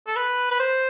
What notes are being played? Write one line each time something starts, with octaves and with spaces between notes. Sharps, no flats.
A4
B4
B4
C5